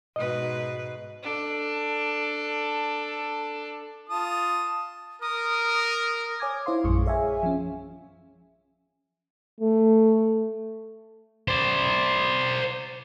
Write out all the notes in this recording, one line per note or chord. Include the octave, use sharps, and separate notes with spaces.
G#2 B2 B4 D#5
D4 A4
F4 A5 D#6
A#4 D#6
C#5 G#5 D6 D#6 G#6
E4 C5 F5 C6
A#1 F#2 G#3 C#6
G#4 C#5 E5 F5 G#5
F3 C#4
A3
C5 D5